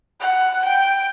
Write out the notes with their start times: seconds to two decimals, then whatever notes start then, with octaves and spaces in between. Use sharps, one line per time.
0.21 F#5
0.65 G5